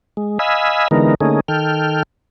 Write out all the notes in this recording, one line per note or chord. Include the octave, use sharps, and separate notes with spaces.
G#3
D#5 F5 G#5 B5 E6
D3 E3 G#3 B3 D#4 A#4
D3 A3 A#3 C#4 D#4 G#4
D#3 A4 G5 F6